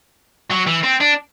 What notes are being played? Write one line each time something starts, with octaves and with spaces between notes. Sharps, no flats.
F#3
E3
C4
D4